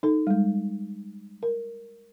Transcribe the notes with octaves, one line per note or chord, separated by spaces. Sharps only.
D#4 A4
G3 G#3
A#4